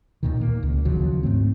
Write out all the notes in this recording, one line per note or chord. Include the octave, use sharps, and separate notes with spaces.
D#2 A#2 D#3
A#3
C#2
D#2 C#3 F3 F#3
G#2 A3 C4